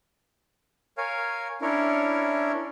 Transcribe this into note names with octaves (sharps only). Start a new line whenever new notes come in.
A#4 C#5 F5 G#5
C#4 D4 E4 A#4 C#5